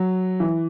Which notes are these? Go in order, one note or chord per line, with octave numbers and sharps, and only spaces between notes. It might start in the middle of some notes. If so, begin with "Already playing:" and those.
Already playing: F#3
E3